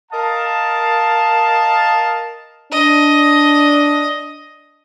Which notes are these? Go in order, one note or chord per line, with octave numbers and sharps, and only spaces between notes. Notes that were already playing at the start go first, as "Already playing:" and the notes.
A#4 D#5 F5 A5
D4 D#5